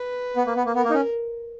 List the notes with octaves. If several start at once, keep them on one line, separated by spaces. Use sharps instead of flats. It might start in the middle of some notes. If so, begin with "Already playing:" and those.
Already playing: B4
B3
A#3
B3
A#3
B3 A#4
A#3
D#4
C#4